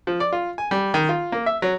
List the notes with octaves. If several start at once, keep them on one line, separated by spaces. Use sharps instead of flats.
F3
D5
F4
G#5
G3
D#3
F4
A#3
E5
F#3